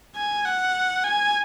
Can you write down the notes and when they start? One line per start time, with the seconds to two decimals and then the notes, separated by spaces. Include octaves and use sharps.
0.16 G#5
0.45 F#5
1.04 G#5